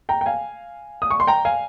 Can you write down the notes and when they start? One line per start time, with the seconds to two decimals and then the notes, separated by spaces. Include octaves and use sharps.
0.09 G5 A#5
0.21 G5
0.26 F5 G#5
1.02 D#6
1.11 C#6
1.20 C6
1.27 G5 A#5
1.45 F5 G#5